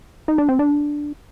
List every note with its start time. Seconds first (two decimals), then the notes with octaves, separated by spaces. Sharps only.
0.28 D#4
0.38 D4
0.49 C4
0.59 D4